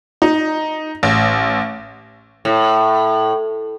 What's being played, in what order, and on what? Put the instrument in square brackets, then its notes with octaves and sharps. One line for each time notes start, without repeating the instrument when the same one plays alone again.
[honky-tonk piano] D#4
A1
[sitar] A2